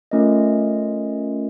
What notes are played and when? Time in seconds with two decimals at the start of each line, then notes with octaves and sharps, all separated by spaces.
0.11 A3 C#4 F4 A#4 D#5